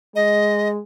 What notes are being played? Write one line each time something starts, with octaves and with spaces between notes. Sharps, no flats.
G#3 D#5